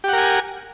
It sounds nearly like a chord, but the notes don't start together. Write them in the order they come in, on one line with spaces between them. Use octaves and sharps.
G4 F#5 A#4 G#5